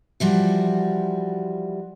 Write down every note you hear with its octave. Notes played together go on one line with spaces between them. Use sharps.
E3 F3 G3 F#4